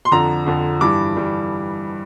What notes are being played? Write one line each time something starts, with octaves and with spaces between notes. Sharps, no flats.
C6
F2 D3 F3 A#5
F2 D3 F3
G2 E3 G3 D6
G2 E3 G3